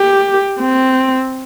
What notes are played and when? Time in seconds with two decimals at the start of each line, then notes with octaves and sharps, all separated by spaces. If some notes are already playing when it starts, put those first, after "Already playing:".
Already playing: G4
0.60 C4